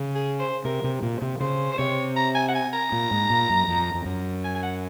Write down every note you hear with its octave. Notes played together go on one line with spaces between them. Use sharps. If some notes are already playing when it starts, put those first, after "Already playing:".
Already playing: C#3
G#4
C5
C3 A#4
C3
A#2
C3
C#3 C5
C5
C3 C#5
A#5
G#5
F#5
G#5
A#5
A#2
G#2
A#2
F#2
F2
F2
F#2
G#5
G#5
F#5